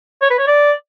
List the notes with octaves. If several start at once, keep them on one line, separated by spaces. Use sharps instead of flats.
C#5
B4
C#5
D5